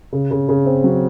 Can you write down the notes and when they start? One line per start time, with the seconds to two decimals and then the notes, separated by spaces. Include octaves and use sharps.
0.12 C#3
0.31 C#3
0.49 C#3
0.66 C4
0.84 F#3